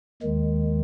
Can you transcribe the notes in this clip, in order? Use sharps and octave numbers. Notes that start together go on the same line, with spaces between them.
D#2 D#3 G#3